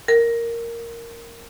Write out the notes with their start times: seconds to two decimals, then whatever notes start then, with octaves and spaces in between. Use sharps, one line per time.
0.08 A#4